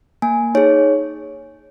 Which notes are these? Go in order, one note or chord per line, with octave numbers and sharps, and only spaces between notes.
A#3 G#5
D#4 G#4 C#5